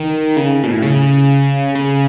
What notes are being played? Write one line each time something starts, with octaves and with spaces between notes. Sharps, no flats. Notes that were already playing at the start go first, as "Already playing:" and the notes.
Already playing: D#3
C#3
B2
A2
C#3
C#3